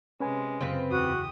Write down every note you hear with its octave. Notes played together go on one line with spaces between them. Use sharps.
C3 G#3 C#4 B4 G#5
F#2 C#3 C4 F4 B4
E2 F#4 G4 D#6